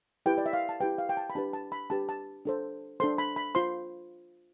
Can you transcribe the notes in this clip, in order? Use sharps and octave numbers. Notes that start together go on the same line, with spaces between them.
E4 G4 B4 G5
D5
E5
F5
A5
E4 G4 B4 G5
F5
G5
A5
B5
D4 G4 B4 A5
A5
B5
D4 G4 B4 A5
A5
D4 A4 C5
D4 A4 C5 C6
B5
B5
F4 C5 C6